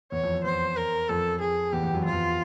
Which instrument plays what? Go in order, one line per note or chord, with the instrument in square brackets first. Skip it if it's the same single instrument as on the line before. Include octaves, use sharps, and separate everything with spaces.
[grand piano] E2 [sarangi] C#5
[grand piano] F2
F2
[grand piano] E2 [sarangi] C5
[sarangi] A#4
[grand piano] F2 [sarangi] A4
[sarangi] G#4
[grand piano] E2 [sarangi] G4
[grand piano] E2
F#2
[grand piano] F2 [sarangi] F4
[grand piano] E2